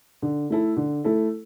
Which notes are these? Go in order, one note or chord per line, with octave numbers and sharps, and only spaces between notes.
D3
A3 E4 A4
D3
A3 E4 A4